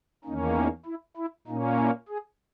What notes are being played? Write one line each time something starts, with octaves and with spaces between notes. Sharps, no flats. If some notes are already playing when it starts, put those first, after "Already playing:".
E2 D#3 A#3 C#4 D#4
E4
E4
E4
A#2 A#3 C#4 D#4
E4
G#4